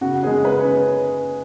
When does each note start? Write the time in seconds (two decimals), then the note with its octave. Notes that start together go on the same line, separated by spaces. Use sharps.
0.01 C#3 F#4
0.23 G#3 C#4 G#4
0.45 C#3 B4
0.59 C#5